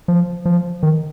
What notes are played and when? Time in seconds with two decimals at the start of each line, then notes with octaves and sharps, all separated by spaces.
0.08 F3
0.45 F3
0.83 D#3